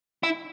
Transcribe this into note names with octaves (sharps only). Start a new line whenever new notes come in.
E4